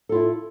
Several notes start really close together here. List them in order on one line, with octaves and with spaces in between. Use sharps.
A4 F4 E4